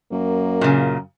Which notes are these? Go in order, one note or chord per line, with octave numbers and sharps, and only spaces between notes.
F#2 A#3
A#2 C#3